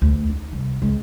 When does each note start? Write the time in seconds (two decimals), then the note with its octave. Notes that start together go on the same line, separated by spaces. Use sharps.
0.02 D2
0.30 D#4
0.53 C2
0.82 C#2